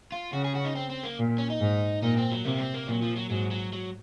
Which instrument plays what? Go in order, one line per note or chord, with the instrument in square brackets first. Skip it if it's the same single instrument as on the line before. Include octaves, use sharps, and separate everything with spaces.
[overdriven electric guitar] F4
[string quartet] C#3 [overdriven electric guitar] F#4
[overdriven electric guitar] G#4
F#4
D#4
C4
C4
A#3
[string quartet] A#2
[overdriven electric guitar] C#4
D#4
[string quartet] G#2
[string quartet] A#2 [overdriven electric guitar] D#4
[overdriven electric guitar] C4
F#3
[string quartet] C3 [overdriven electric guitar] A#3
[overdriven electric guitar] C4
A#3
[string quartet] A#2 [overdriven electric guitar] F#3
[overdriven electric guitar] F3
F#3
[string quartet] G#2 [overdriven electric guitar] F#3
[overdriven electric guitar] F#3
F#3